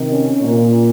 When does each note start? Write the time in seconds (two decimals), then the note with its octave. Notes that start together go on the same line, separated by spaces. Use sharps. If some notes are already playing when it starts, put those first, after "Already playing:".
Already playing: C3 D#3
0.08 C#4
0.41 A#2